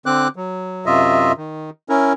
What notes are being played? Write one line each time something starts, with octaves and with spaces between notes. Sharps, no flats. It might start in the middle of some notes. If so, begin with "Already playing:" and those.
D3 C4 D6 F#6
F#3
F#2 C3 F4 D#5 E5
D#3
C#4 E4 A#4